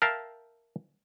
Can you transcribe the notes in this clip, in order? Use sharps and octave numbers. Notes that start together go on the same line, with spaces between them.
A#4 E5 F5 G5 A5 A#5